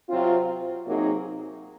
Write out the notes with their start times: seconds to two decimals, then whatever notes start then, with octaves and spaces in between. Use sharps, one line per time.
0.09 C3 F#3 C4 F4
0.85 C3 F#3 A#3 D#4 G#4